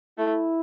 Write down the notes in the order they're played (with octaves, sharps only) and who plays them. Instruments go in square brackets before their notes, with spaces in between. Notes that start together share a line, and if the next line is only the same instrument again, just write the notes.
[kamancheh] A3 [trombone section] E4